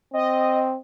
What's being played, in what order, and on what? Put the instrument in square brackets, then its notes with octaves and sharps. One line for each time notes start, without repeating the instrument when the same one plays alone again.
[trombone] C4 [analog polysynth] D#5